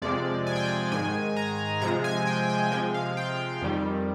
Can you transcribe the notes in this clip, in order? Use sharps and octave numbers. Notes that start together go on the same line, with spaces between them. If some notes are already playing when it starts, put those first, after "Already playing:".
F2 C3 F3 G#3 D5
G#5
G5
G#5
G#2 D#3 G#3 G#5
A#5
C3 F3 G#3 A#5
G#5
G5
G5
C3 F3 G#3 G5
F5
G5
F2 D#3 G3